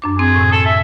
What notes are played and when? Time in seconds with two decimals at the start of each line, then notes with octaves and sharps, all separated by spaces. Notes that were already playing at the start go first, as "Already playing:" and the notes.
0.02 F#2 D4 D6
0.19 C4 G#4
0.36 A2 C3
0.52 A4
0.65 E5